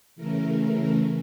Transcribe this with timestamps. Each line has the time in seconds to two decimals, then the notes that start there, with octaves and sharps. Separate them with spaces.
0.16 C#3 E3 A3 A#4
0.59 A#4